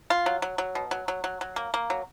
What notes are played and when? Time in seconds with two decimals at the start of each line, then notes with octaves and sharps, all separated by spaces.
0.10 F4
0.26 F#3
0.42 F#3
0.58 F#3
0.75 B2
0.91 F#3
1.08 F#3
1.24 F#3
1.41 F#3
1.56 A#3
1.74 A#3
1.90 F#3